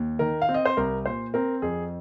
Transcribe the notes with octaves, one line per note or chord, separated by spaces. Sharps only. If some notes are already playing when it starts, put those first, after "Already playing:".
Already playing: D#2
D#3 A#4
F5
C4
D#5
C5
C2 A#4
A#2 C5
C4 A#4
F2 G#4